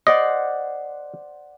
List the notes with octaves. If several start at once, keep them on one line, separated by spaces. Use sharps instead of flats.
C5 D5 D#5 F#5